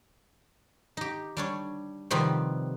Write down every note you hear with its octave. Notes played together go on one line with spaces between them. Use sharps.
D#4 G4
G3 D4 C#5
C3 D#3 F3 G3 B3 C4